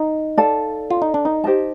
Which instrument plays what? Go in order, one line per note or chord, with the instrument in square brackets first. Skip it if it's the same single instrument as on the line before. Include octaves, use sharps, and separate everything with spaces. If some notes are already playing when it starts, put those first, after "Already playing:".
Already playing: [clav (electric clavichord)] D#4
[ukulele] A4 D5 F5 A5
[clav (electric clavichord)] F4
D#4
D4
D#4
[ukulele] G4 C5 D#5 A5